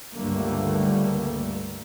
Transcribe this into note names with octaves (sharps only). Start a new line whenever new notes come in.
C#2 G2 D3 G3 A3 A#3